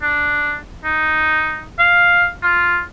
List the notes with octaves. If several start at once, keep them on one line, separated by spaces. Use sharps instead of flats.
D4
D#4
F5
F4